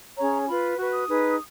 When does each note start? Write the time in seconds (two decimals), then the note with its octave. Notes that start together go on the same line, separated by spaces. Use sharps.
0.18 C#4 G#4 C#5 A#5
0.47 F4 B4 B5
0.77 F#4 B4 C#6
0.92 D#6
1.07 D#4 G#4 B4